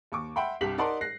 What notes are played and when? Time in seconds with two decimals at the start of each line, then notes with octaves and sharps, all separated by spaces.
0.12 D#2 C#6 D6
0.36 E5 F#5 G5 B5 C6
0.61 C2 G2 G4 B6 F#7
0.78 D#4 A#4 D5 F#5 A5 C6
1.01 F#6 A#6 C7